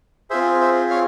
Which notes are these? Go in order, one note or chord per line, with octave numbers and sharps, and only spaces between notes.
C4 F4 G#4 C5 E5
C5 E5
C#5 F5